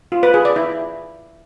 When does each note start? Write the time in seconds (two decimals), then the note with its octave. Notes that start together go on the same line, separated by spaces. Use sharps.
0.12 F4
0.23 B4
0.34 G#4
0.45 D5
0.56 E4